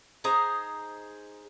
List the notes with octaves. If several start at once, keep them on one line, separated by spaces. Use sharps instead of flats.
D#4 G#4 C5 A#5